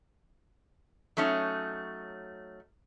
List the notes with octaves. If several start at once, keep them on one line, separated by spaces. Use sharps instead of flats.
F#3 A3 C#4 D#4